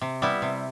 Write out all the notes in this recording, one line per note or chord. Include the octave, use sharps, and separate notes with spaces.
C3
G3 B3 E4
C3